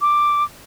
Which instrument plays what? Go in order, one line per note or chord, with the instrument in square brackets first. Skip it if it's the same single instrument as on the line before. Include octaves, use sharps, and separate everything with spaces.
[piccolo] D6